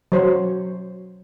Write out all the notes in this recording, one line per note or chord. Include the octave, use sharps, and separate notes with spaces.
F#3 C5 C#5